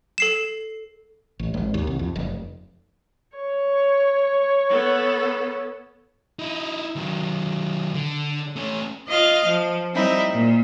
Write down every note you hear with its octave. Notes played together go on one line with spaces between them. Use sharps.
A4 C7 E7
A1
G#1
D#2
C2
F2
F1
C#5
B3 A4
D#4 E4
D#3 F#3
D3
A3 C#4
F4 D#5 F5 F6
F3
G3 C4 D#4 E4
A#2